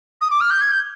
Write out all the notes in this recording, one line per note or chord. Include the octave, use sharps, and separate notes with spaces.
D#6
D6
F6
G6
G#6
G6